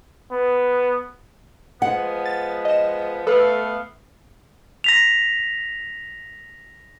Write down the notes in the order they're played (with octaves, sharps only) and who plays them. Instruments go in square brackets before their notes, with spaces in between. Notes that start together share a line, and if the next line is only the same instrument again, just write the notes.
[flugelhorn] B3
[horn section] F3 G#3 B3 [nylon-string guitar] F#5
[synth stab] A6
D#5 E7
[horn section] A3 B3 F5 [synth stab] A4 B4
[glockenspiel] A#6 B6 F7